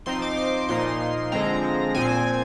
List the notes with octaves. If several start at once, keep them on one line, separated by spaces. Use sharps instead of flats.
F3 C4 D#4 C6
D6
D6
A#2 F3 A#3 D#4 C6
D3 F3 G#3 C4 A#5
A#2 F3 C4 G#5